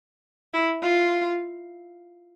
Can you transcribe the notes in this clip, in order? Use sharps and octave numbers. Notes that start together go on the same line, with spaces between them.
E4
F4